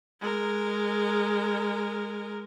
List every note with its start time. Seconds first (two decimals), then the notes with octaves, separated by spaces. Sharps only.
0.21 G#3 A#4